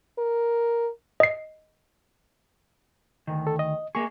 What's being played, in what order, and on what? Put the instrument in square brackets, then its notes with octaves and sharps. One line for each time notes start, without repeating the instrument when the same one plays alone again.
[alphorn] A#4
[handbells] D#5 C7
[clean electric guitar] D2 D#3
[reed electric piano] A4
D#5
[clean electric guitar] A#3 G#4 [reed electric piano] C#6